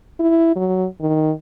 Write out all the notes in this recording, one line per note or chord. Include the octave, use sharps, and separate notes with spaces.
E4
F#3
D#3